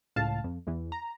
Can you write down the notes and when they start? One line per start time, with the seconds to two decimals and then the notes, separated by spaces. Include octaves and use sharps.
0.16 C#2 A2 F5 A5
0.44 F2
0.67 E2 E3
0.92 A#5